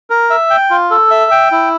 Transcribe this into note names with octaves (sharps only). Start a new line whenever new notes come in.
A#4
E5
G5
F4
A4
E5
G5
E4